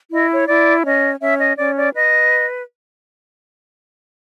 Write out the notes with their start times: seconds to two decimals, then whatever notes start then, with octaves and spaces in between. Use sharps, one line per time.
0.11 E4 D#5
0.30 C#5
0.48 E4 D5
0.85 C#4 D#5
1.21 C#4 E5
1.39 D#5
1.57 C#4 D5
1.76 D5
1.94 B4 D#5